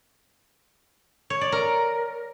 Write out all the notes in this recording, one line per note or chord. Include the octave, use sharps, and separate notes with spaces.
C#5
D5
A#4